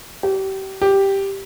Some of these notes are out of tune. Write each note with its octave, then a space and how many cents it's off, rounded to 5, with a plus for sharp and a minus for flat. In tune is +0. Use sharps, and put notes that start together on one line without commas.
G4 -30
G4 +0